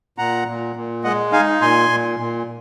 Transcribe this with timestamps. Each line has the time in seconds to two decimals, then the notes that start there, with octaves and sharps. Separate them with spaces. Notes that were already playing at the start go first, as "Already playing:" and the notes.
0.18 A#2 F#5 A#5
0.48 A#2
0.76 A#2
1.04 G#3 D#5 F#5
1.32 D#4 F5 G#5
1.61 A#2 G#5 C6
1.89 A#2
2.19 A#2